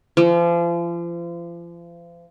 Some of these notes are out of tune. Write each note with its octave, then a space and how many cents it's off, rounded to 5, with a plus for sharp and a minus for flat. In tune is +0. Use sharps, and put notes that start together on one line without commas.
F3 -35